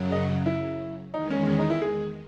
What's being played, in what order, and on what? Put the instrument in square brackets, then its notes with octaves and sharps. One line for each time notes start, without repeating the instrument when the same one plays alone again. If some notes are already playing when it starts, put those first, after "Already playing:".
Already playing: [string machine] F#2 C#3 F#3
[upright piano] D#5
E4
[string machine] E2 D#3 G#3 [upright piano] D#4
[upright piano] C#4
C#4
D#4
E4
G#4